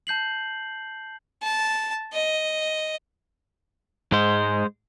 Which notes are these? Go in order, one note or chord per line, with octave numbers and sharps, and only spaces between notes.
A5 G6 C7 F#7
A5
D#5
G#2 G#3 C5